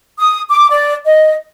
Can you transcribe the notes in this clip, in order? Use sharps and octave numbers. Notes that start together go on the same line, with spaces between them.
D#6
D6
D5
D#5